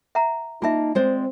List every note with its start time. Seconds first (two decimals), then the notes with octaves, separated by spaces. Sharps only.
0.15 E5 F#5 A#5
0.62 A#3 D#4 F4 E5 A5
0.95 G#3 C4 C5 D5